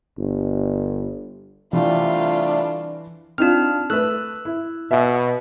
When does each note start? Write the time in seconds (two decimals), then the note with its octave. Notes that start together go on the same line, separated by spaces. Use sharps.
0.18 G1
1.73 C3 E3 G3 A3 D4 F4
3.38 C4 D4 D#4 F4 F6
3.90 A3 B4 E6 F#6
4.45 E4
4.91 B2 E5